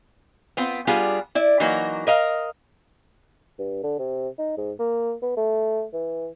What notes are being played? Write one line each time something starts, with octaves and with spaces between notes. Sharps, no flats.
B3 C4 F4
G3 B3 D4 F4 G#4
E4 D5
E3 F#3 A#3 D#4 F#4
A#4 D#5 F5
G2
D3
C3
D#4
G#2
A#3
B3
A3
E3